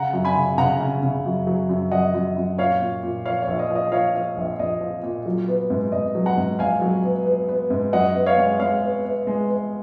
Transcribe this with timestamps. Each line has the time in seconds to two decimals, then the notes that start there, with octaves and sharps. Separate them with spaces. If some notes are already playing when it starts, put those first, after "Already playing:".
Already playing: C#3 F#5 A#5
0.13 F#2
0.25 G#5 B5
0.36 C#3
0.58 C#3 F#5 A#5
0.80 C#3
1.03 C#3
1.26 F#2
1.47 F#3
1.69 F#2
1.91 F#2 D#5 F#5
2.14 F#2
2.37 F#2
2.58 A#2 C#5 F5
2.81 A#2
3.03 A#2
3.26 F3 C#5 F5
3.42 C#5
3.47 A#1
3.59 D#5
3.70 F3
3.75 D#5
3.92 F3 C#5 F5
4.15 F3
4.37 A#1
4.59 A#1 D#5
4.81 F3
5.03 A#2
5.26 F#3
5.48 B3
5.70 G#2
5.92 G#2 D#5
6.15 F#3
6.26 F#5 A#5
6.37 G#2
6.59 A#1 F5 G#5
6.82 F#3
7.04 B3
7.26 B3
7.49 B3
7.70 G#2
7.93 F#2 D#5 F#5
8.15 B3
8.26 C#5 F5
8.37 G#3
8.59 G#3 C#5 F5
8.81 B3
9.04 B3
9.27 G#3
9.49 B3